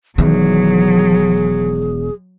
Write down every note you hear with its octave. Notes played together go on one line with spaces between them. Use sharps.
E1 E2 D#3 F#3 G#4